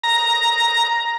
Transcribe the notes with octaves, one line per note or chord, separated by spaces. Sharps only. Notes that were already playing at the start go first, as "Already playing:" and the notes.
A#5